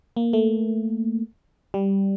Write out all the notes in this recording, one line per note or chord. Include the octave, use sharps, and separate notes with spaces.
A#3
A3
G3